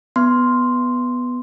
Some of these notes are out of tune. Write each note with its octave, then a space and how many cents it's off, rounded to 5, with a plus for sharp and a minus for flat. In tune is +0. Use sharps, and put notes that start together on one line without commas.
B3 +0 C6 +0